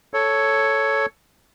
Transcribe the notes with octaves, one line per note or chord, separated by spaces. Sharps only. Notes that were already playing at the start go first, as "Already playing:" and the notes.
A4 C#5